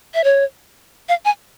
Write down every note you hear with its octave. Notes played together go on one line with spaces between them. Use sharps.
E5
C#5
F5
G#5